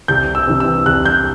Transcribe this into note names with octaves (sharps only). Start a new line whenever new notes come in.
C2 G6
E6
C3 E3
E6
C2 F#6
G6